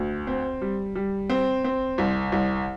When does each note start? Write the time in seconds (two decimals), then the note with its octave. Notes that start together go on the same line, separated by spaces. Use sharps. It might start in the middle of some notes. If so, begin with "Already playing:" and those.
Already playing: D2
0.27 C4
0.62 G3
0.95 G3
1.30 C4
1.64 C4
1.98 C2
2.32 C2